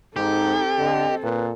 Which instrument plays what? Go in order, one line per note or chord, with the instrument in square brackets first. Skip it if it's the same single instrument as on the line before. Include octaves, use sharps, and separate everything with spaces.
[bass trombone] G#2 [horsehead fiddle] C4 A4 [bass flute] D#4 [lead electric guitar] G4
[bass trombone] D3 [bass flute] D#5
[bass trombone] A#2 [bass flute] B4